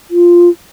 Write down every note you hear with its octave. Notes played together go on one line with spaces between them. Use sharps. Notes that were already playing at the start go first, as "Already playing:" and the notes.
F4